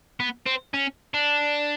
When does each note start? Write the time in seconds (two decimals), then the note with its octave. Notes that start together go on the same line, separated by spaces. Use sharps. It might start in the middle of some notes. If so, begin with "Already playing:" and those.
0.20 B3
0.46 C4
0.74 C#4
1.14 D4